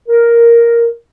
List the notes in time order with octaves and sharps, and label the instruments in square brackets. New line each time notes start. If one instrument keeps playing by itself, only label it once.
[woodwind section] A#4